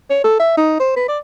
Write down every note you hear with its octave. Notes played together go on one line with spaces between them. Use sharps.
C#5
A4
E5
D#4
C5
B4
D5